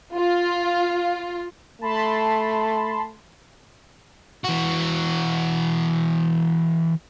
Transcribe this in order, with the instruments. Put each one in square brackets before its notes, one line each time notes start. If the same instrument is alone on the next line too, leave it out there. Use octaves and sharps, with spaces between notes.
[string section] F4
[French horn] A3 [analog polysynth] A5 B5 C6
[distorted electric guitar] E3 F#4